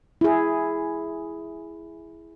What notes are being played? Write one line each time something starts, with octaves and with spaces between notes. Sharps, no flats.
E4 G#4